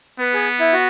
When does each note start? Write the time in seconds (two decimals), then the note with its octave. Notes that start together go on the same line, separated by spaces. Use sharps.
0.19 B3 B4
0.34 G#4
0.60 E4
0.73 F#4